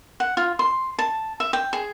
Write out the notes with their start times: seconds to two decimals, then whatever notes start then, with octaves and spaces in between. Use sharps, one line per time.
0.20 F#5
0.37 F4
0.59 C6
0.99 A5
1.40 E5
1.53 G5
1.73 G#4